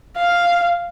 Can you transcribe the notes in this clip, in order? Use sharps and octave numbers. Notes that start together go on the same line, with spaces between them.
F5